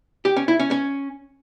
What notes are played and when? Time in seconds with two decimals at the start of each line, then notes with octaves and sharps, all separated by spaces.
0.25 G4
0.36 C#4
0.48 E4
0.60 C#4
0.71 C#4